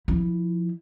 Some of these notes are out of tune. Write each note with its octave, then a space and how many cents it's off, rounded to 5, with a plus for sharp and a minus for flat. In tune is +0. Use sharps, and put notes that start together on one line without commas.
F3 +0 E4 +0